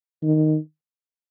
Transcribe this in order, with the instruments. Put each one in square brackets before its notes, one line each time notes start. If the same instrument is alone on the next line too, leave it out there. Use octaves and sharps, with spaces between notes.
[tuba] D#3